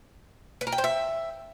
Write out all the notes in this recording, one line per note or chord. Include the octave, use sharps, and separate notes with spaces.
B4
A#4
G5
C5
E5